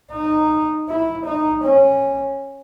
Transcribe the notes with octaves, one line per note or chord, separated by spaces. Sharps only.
D#4
E4
D#4
C#4